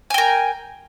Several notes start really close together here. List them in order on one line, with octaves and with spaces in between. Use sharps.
G#5 G5 A#4